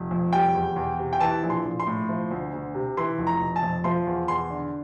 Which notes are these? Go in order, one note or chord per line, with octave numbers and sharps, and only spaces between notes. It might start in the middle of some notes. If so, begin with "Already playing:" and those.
Already playing: F1
F2
G3 G5
E2
E2
C3
G5
E3 A5
A#1
C6
A#1
C6
A2
F3
D2
D2
C3
E3 C6
F1
A#5
F1
A5
F2
F3 C6
E2
E2 C6
D3